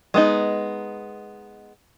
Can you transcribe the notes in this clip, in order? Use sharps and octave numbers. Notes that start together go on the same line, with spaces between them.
G#3 B3 D#4